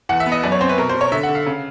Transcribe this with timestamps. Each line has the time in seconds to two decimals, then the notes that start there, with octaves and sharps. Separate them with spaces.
0.09 E2 F#5
0.20 E5
0.26 B3
0.32 D#5
0.43 F#2 D5
0.52 C#5
0.60 C4 C5
0.69 B4
0.78 B2 A#4
0.89 C5
0.94 B2
1.01 C#5
1.12 D3 E5
1.23 F#5
1.29 D3
1.35 F5
1.46 C#3